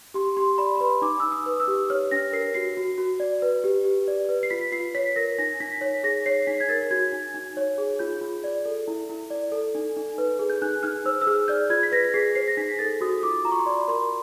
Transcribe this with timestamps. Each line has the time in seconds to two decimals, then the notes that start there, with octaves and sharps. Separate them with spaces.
0.14 G4 C6
0.37 G4 C6
0.58 D5 B5
0.76 B5
0.80 B4 C6
1.02 D#4 D6
1.20 D#4 E6
1.32 D#6
1.46 B4
1.60 E6
1.68 G4
1.90 C#5 F6
2.11 D4 A#6
2.33 A#4 C7
2.54 F#4 C7
2.77 F#4
2.98 F#4
3.20 D5
3.42 B4
3.64 G4
3.85 G4
4.08 D5
4.29 B4
4.43 C7
4.50 F4 B6
4.72 F4 C7
4.95 C#5 B6
5.16 A#4 A#6
5.38 D#4 A#6
5.60 D#4 B6
5.81 C#5 B6
6.03 G#4 A#6
6.26 C#5 C7
6.42 C7
6.47 D#4 B6
6.60 G#6
6.69 A#4 A6
6.91 F#4 G#6
7.12 D#4
7.34 D#4
7.57 C#5
7.78 G#4
7.99 F4 G6
8.21 F4
8.44 D5
8.66 A4
8.88 E4
9.09 E4
9.30 D5
9.52 A4
9.75 D#4
9.97 D#4
10.18 B4
10.39 G#4
10.50 G6
10.62 D#4 F#6
10.83 D#4 F6
11.06 C5 E6
11.21 E6
11.27 G#4 F6
11.48 D5 G6
11.70 F4 G#6
11.83 B6
11.92 B4 A#6
12.04 B6
12.14 G#4 C7
12.35 C5 C7
12.48 A#6
12.57 D#4 B6
12.79 A4 A6
13.01 F#4 D#6
13.23 F4 D6
13.45 F4 A#5
13.52 C#6
13.59 C6
13.66 D5 B5
13.88 A#4 C6